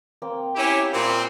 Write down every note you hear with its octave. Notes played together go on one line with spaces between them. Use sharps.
A#3 C4 G5
C#4 E4 G4
A#2 A#3 C4 A#5 B5